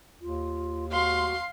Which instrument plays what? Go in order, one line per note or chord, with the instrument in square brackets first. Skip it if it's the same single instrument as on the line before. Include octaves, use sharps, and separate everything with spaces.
[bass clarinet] D#2 [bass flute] F4
[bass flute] F#4 [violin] F5 [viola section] C6